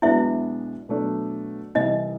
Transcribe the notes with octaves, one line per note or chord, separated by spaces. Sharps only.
B1 B2 G#3 B3 D4 E4 E5
B2 F#3 A3 D4
C2 C3 E3 D#4 D#5